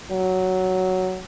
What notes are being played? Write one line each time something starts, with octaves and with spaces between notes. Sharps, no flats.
F#3